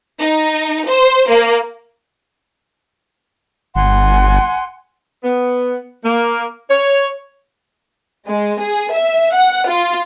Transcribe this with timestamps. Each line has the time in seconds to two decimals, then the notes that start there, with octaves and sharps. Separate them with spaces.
0.20 D#4
0.87 C5
1.29 A#3
3.75 G1 F#5 G#5 C6
5.24 B3
6.04 A#3
6.70 C#5
8.27 G#3
8.60 G#4
8.93 E5
9.34 F#5
9.68 F4